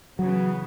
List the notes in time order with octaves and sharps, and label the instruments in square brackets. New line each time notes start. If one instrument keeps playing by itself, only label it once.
[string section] C#3 E3 B3 [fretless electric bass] F#3